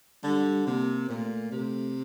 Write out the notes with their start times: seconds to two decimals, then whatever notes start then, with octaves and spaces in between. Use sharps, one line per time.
0.24 D3 G3
0.66 C3 A#3
1.09 A#2 A3
1.52 C3 A3